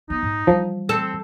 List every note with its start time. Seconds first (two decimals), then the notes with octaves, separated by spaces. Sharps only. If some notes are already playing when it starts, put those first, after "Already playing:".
0.10 B3 D#4
0.23 G#2
0.47 E3 F3 G3
0.89 C4 A4